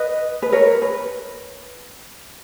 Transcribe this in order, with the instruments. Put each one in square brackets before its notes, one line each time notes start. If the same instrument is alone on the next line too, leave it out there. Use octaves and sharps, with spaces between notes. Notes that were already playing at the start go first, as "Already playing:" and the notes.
Already playing: [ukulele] B4 D#5
B4
A#4 C#5
B4